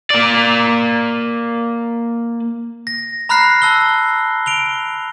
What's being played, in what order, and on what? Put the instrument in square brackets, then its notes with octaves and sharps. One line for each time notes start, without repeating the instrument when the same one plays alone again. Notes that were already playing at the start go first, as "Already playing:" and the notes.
[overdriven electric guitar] A#3 D5
[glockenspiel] A#6
A#5 B5 F6 F#6 A#6 C7
A5 E6 G7
D7 F7 G7